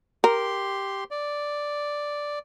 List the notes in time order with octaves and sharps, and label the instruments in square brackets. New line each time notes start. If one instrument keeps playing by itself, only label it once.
[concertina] G4 C6 [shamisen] A#4
[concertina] D5